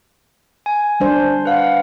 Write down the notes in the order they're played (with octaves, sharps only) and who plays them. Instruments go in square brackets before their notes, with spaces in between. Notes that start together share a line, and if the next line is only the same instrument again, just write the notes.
[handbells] G#5
[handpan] G3 D4 C5
[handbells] B4 F5 F#5